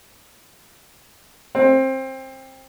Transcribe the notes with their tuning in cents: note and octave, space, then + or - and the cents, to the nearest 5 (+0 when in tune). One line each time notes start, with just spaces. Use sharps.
C4 +20